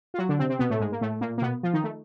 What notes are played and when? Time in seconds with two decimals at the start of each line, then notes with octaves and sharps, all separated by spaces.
0.14 F4
0.18 F#3 F#4
0.29 D3 D4
0.39 C3 C4
0.49 C3 C4
0.59 B2 B3
0.70 A2 A3
0.80 G#2 G#3
0.92 A#3
1.01 A2 A3
1.21 A#2 A#3
1.38 A#3
1.42 B2 B3
1.63 F3 F4
1.74 D#3 D#4
1.84 A3